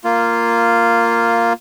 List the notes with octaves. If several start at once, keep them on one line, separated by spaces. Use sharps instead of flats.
A#3 F4